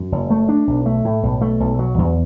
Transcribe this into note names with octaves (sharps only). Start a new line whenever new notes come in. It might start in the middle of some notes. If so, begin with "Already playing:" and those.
Already playing: F#2
F#1
A3
D4
B1
A3
A2
B1
A3
B1
F#3
E2